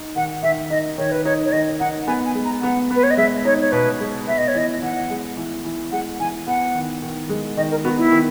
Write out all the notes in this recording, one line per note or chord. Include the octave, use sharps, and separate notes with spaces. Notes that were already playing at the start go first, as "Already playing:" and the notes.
Already playing: D#4
D#3 F#5
D#3 E5
D#4 D#5
D#3 C#5
B4
D#4 C#5
C#5
D#3 D#5
D#4 F#5
B3 G#5
G#5
G#3
A#5
B3 F#5
B3 B4
C#5
D#5
G#3 E5
D#4 C#5
C#5
B2 B4
G#3
B3 E5
D#5
C#5
E3 D#5
E3 F#5
G#3
E3
E3
G#3 F#5
E3 G#5
B3 F#5
D#3
D#3
G#3
D#3 D#5
A#4
B3 F#4
E4
D#3